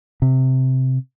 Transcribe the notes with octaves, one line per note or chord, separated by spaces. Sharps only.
C3